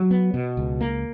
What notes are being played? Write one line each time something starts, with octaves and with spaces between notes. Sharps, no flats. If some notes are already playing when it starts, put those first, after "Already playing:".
Already playing: F#3
B3
B2
C#2
A#3